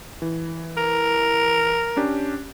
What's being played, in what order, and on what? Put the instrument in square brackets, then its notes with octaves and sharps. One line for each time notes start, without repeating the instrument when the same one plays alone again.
[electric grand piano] E3
[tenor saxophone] A#4
[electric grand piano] C#4 D4 G4